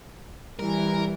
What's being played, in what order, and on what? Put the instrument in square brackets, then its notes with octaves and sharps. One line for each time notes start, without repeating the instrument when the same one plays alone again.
[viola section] E3 [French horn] G3 [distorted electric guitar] A#4